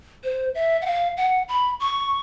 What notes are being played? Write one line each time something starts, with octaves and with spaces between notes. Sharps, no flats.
C5
E5
F#5
F5
F#5
B5
C#6